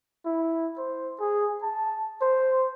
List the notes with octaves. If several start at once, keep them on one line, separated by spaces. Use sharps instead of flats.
E4
C5
G#4
A5
C5